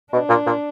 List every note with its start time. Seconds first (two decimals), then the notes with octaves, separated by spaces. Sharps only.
0.13 B2 D4
0.29 A#2
0.46 A#2